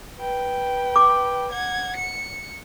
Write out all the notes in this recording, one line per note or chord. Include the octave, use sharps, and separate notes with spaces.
B4 G5
D6
F#5 G#6
C#7